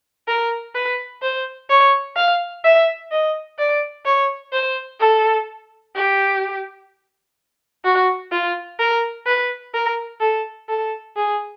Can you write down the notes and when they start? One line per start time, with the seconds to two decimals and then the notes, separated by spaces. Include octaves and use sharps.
0.28 A#4
0.75 B4
1.22 C5
1.70 C#5
2.16 F5
2.64 E5
3.12 D#5
3.59 D5
4.06 C#5
4.53 C5
5.00 A4
5.96 G4
7.85 F#4
8.32 F4
8.80 A#4
9.27 B4
9.74 A#4
10.21 A4
10.69 A4
11.16 G#4